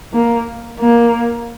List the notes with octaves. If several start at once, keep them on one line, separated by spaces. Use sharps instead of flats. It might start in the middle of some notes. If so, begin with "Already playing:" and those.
A#3
A#3